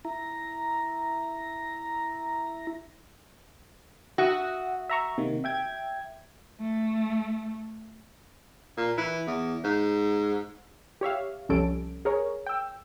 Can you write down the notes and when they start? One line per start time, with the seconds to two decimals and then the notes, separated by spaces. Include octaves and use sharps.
0.05 E4 A#5
4.18 F#4 E5 F#5 D#6
4.90 E5 A#5 C#6
5.18 C3 D#3 A#3
5.44 E5 G5 G#6
6.60 A3
8.78 A#2
8.97 E3
9.27 E2
9.64 G#2
11.01 G4 C#5 E5 F5
11.49 C2 F2 G3 C#4 A4 D7
12.05 G#4 A#4 C#5
12.46 G5 E6